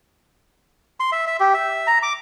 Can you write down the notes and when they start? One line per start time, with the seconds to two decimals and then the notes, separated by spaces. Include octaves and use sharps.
1.00 C6
1.12 E5
1.27 E5
1.40 G4
1.54 E5
1.87 A#5
2.03 D6